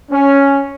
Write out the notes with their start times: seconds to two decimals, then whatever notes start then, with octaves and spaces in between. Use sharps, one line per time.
0.11 C#4